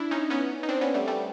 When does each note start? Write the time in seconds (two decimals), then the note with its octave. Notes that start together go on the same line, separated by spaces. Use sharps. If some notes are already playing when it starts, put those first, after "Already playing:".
Already playing: D4 E4
0.11 C#4 D#4
0.30 B3 C#4
0.63 D#4
0.69 C4 D4
0.81 B3 C#4
0.94 G3 A3
1.08 G3 A3